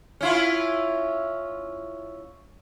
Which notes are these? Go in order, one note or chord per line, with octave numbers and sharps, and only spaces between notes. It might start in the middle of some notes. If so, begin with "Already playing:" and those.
C#4 E4 F4